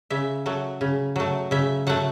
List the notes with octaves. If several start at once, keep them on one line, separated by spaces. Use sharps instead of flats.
C#3 E5
F#3 A3
C#3
F#3 A3
C#3 E5
F#3 A3 F#5